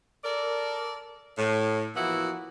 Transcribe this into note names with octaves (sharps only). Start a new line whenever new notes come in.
A4 A#4 D5
A2
E3 F3 A#3 B3 E4 F#4